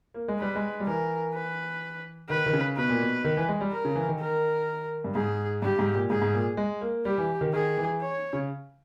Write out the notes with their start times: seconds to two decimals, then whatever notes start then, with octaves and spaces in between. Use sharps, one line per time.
0.14 A#3
0.28 G#3
0.39 G3 B4
0.55 G#3
0.80 G3
0.86 E3 A#4
1.35 B4
2.29 D#3 B4
2.46 D#3
2.53 C#3
2.77 B2 B4
2.89 A#2
3.01 B2
3.24 D#3
3.37 E3
3.49 G#3
3.61 G3
3.72 A#4
3.85 C#3
3.95 E3
4.08 D#3
4.20 A#4
5.04 G2
5.15 G#2 G#4
5.62 G2 G4
5.79 G#2
5.94 A#2
6.10 G#2 G#4
6.22 G#2
6.34 A#2
6.57 G#3
6.81 A#3
7.05 G3 G4
7.18 E3
7.41 D#3
7.53 D#3 G#4
7.78 E3
8.01 C#5
8.33 C#3